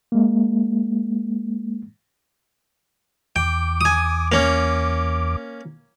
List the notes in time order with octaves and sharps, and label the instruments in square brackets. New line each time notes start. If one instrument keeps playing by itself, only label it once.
[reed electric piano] G#3 A#3
[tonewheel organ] E2 D6 [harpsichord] G5
[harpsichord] G#5 D#6
A#3 C#4